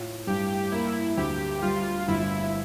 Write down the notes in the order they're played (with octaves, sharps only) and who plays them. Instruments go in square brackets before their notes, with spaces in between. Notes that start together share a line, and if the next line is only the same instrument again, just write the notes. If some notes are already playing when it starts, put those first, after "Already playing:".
Already playing: [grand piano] A2 F4
[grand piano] G2 [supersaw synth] G4
[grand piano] A#3 [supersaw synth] E4
[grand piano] D2 [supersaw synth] G4
[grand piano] G3 [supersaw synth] F4
[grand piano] G1 [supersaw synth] E4